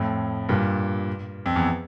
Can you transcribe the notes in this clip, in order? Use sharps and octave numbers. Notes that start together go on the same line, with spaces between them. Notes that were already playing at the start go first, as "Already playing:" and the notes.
Already playing: F2 A2
G2 A#2
F2
E2